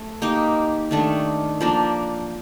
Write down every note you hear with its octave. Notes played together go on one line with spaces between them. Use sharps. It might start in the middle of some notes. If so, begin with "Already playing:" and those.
Already playing: A3
A#3 D#4 G4
D#3 A3 D4
F3 A#3 D4